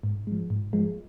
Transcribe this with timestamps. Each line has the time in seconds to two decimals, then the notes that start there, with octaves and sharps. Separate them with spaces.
0.03 G#2
0.27 F3 G#3
0.50 G#2
0.73 F3 G#3